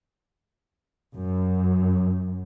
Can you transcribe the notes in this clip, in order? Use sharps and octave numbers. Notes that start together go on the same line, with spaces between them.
F#2